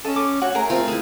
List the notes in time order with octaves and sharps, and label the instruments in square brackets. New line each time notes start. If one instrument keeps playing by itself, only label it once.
[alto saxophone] C#4 [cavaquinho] A4 D#5
[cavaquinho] D6
[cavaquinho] F#4 [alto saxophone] C#5
[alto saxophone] A3 [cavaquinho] G#4 A#4 A#5
[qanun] C4 F4 G5
G#3 E4